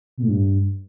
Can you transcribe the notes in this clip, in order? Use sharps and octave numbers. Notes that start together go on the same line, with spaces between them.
B2
A2
G2